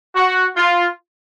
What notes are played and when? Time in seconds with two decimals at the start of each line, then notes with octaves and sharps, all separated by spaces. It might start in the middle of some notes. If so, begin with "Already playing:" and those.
0.16 F#4
0.56 F4